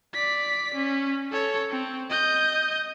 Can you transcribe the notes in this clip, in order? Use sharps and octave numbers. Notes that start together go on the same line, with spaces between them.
D5 B6
C#4
A4 C#5
C4
D#5 G6